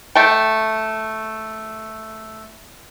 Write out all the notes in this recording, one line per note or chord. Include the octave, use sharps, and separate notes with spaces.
A3 G5